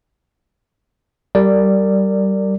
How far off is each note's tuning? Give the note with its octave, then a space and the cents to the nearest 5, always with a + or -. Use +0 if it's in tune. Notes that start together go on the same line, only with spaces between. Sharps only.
G3 -15 A#4 -30 D5 +0